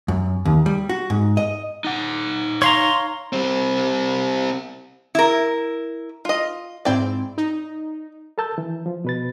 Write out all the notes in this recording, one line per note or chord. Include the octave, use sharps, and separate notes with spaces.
F#2
D#2
G3
F#4
G#2
D#5
D#4 F#5
C#5 F5 A#5 C6
G3 C4
E4 A#4
F4 D#5
G#2 C4 E4 D5 G5
D#4
A4 A#4 A5 E6 G6
E3
F3
B2 B4 A6